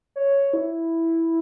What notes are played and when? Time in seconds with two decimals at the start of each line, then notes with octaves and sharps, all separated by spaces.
0.16 C#5
0.53 E4